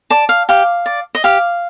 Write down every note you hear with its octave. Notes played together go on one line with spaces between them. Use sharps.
D5 A5
F5
G4 F5
D5
D#5
G4 F5